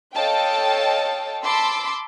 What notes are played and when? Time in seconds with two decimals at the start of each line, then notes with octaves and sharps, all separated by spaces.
0.14 A4 C#5 D#5 F5 G5 A5
1.43 A5 B5 C6 D6 E6